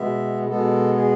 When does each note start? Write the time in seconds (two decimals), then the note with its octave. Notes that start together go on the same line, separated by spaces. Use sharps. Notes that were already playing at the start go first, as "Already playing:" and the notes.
Already playing: B2 G#3 B3 E5
0.48 B2 G#3 B3 A4
0.94 G#4